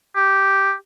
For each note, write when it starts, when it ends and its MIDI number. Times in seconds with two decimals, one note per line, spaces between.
0.16 0.73 67